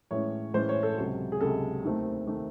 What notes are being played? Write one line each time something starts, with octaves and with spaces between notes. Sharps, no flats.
A2 E3 G#3 C#4 C#5
A2 E3 G#3 C#4 C5
C#5
A4
C#2 C3 F#3
G#4
C#2 C3 F#3 A4
D#2 D#3 A3 C4
D#3 A3 C4